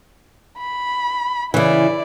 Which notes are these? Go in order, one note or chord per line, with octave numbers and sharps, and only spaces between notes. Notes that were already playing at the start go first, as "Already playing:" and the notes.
B5
C#3 E3 E4 D5